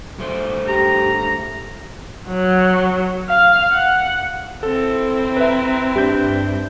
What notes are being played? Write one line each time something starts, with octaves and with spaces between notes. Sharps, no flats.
G2 A3 C5
G4 A#5
F#3
F5
F#5
C4 E4 A4
B4 E5 A#5
G2 D4 G4 G6